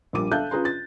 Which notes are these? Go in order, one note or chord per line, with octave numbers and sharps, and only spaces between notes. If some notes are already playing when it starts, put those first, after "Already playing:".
A#1 F3 G3 A#4 D6 D#7
A4 E5 F5 A5 F#6 G6
C#4 F4 G#4 B4 A#5 C6
A6